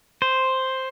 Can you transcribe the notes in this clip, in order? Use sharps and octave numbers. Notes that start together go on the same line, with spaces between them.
C5